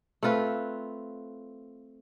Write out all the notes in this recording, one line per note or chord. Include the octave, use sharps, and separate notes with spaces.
A3 C4 F4 B4